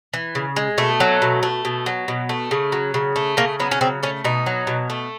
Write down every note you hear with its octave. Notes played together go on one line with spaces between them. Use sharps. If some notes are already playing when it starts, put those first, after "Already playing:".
E3
C#3
G#3
B2 A3
F#3
B2
A3
B2
F#3
B2
A3
C#3
F#3
C#3
A3
C#3 A#3
F#3 B3
C#4
C#3 C4
A3 C#4
B2 D#4
F#3
B2
A3